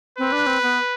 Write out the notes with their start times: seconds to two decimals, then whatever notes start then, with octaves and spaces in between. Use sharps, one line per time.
0.18 C4 B4
0.32 D4
0.47 C4
0.63 B3